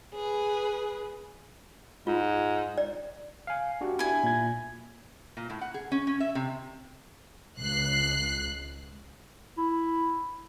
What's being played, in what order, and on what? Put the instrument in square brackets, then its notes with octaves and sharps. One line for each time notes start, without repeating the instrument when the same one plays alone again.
[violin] G#4 B4
[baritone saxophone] G#2 [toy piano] F4
[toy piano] D5
[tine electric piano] F5 G#5
D4 F#4 G4
[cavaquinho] E4 G#5
[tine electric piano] A#2 G#6
[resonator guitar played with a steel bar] A#2
A2
F#5
G#4
C#4
C#4
E5
C3
[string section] C#2 F#6 C7
[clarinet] E4